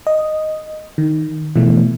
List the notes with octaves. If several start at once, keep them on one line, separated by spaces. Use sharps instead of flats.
D#5
D#3
B2 E3 F3 A3